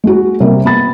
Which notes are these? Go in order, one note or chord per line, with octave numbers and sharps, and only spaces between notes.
G#3 F#4
C3 G3 A#3
B3 B5 A6